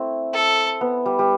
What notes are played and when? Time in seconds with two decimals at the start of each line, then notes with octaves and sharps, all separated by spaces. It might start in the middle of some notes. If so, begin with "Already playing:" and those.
Already playing: A3 C4 E4
0.34 A4
0.81 B3
1.06 G3
1.19 G3